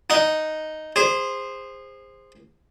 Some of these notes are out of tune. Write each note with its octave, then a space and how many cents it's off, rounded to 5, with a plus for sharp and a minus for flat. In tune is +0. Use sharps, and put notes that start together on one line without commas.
D#4 +0 F#5 -10
G#4 -30 C5 +0